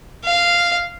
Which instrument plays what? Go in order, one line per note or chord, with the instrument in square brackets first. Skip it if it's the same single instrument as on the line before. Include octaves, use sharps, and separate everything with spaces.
[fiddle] F5